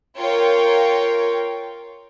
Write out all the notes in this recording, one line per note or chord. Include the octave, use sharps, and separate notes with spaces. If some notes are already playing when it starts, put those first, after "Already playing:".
F4 A#4 C#5 G5